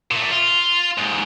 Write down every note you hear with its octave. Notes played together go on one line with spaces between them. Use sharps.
A#2 A3
F4
D#2 G#2